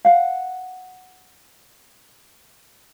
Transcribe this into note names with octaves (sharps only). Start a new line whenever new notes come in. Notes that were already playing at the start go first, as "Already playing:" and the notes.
F5 F#5